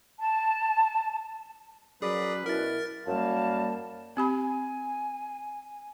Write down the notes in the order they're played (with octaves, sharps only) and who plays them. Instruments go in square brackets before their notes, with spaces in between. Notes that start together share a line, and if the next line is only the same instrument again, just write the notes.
[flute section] A5
[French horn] F#3 [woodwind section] C#4 B4 [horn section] F#4 A#4 D5 [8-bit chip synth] G#4
[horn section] B2 [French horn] E4 [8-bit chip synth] A#4 A6
[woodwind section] F#2 G3 A#3 F5 A5
[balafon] C4 G4 B5 [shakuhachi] G#5